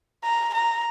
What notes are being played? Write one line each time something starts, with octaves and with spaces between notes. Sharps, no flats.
A#5
A#5